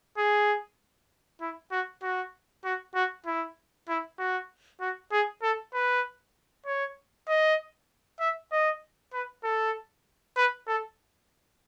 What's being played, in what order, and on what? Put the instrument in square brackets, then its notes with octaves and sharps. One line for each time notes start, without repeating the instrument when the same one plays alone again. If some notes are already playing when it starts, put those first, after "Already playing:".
[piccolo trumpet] G#4
E4
F#4
F#4
F#4
F#4
E4
E4
F#4
F#4
G#4
A4
B4
C#5
D#5
E5
D#5
B4
A4
B4
A4